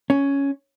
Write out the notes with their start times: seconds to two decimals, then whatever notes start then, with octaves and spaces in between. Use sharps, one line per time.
0.10 C#4